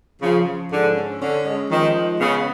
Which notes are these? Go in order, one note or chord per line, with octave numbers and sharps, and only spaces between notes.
C#3 F3
F3
G#2 D3
C#4
D3 C#4
G#3
D#3 F3
G#3
C#3 B3